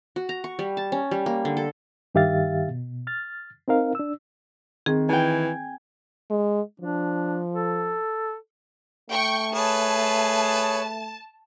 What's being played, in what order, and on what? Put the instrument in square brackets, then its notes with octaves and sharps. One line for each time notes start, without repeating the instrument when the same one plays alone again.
[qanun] F#4
A#5
C#6
G3
A5
C#4
G3
A#3
D3
A4
[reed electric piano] G2 D#3 G4 E5 F5 A6
B2
F6 A6
C4 D#4 A#4 F5
D4 E6
[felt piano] D#3 [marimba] C4 G#4
[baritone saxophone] E3 [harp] G5 G#5
[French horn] G#3
[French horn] F3 [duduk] D4
[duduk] A4
[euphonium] A3 [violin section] G5 C#6
[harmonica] G#4 B4 [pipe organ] C#5 [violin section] A5